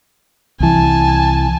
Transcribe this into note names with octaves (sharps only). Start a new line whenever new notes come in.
C2 E3 G#5 A5